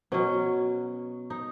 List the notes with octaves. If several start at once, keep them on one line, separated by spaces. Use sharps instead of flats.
B2 F#3 C#4
D#4